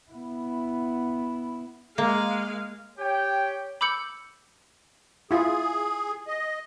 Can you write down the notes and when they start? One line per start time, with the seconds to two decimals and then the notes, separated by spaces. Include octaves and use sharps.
0.11 B3 E4
1.98 G#3 A#3 F5
2.98 G4 C#5 G5
3.81 B5 D6 E6 G6 C#7
5.31 E4 F4 G#4
6.27 D#5